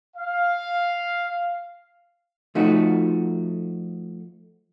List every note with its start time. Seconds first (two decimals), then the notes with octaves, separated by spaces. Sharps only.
0.15 F5
2.55 F3 A3 D#4 F#4